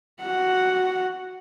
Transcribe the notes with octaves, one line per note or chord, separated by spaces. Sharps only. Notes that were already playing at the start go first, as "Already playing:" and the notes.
F#4 F#5